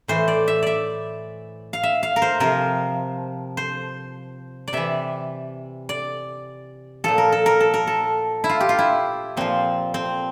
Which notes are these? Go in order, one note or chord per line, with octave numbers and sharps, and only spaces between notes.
A2 E3 C5
D5
E5
D5 E5
F5
E5
F5
A#4
C5
C3 F3 A#4
C5
D5
C3 E3 E5
D5
A#2 F3 A4
A#4
A4
A#4
A4
A#4
A4
E4
F4
G4
F4
E4
A#2 F3 C4
C4